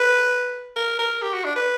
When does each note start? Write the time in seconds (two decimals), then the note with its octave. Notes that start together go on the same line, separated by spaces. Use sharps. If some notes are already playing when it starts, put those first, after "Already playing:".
Already playing: B4
0.76 A#4
0.99 A#4
1.22 G4
1.34 F#4
1.45 D4
1.56 B4